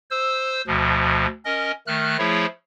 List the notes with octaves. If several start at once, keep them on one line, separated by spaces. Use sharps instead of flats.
C5 E6
D2 B2 F3
C#4 A#4 D#5
D#3 A3 F6 F#6
F3 A3 E4 G#4 C#5